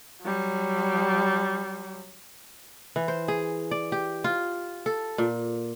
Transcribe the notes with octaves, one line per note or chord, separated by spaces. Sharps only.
F#3 G3
E3
C5
G#4
D5
G4
F4
A4
A#2